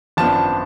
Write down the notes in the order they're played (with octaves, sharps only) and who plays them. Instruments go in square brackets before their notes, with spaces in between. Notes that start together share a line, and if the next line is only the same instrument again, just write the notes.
[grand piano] G#1 F#2 F3 B3 D4 A5